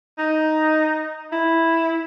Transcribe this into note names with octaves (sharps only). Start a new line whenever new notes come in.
D#4
E4